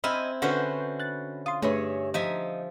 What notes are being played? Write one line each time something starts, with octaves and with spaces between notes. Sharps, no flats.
C4 D#4 E4 G#5 B5 E6 F6
D3 C#4 F#4 B4 C5
F#6 A6
F4 C6 D#6
G2 A3 G#4 B4 C#5 E5
F3 D#4 E5 G#5